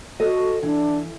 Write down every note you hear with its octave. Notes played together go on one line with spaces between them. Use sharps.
F#4 A4 D#5
E3 D4